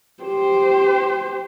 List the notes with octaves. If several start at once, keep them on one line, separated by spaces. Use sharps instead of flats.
G4 C5